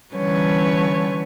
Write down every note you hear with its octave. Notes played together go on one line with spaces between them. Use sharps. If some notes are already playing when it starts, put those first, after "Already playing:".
D3 E3 G3 C#4 B4 C#5